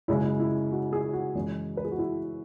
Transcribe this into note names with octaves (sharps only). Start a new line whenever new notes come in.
F#2 C#3 G#3 E4
E4
E4
F#4
G#4
F#4
F#2 E3 G#3
B4
G#4
F#4
E4